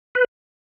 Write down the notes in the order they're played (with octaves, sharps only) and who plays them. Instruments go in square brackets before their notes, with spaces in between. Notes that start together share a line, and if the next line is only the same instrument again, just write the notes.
[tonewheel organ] B4